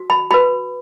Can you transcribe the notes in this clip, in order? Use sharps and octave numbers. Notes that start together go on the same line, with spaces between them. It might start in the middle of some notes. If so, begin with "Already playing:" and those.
Already playing: F#4
B5
F#4 B4 B5